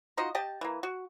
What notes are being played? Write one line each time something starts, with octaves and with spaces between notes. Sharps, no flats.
D#4 F4 F#4 D#5
G4 D#5 G5 A5
E3 A#3
F#4